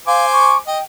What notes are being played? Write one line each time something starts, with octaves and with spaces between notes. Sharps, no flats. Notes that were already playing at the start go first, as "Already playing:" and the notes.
C5 F5 G#5 D6
C#6
D#5 G5